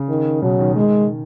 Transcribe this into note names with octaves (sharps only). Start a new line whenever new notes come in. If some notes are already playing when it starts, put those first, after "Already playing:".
Already playing: C#3
D#3
B2 F#3
D#3
D#3 G#3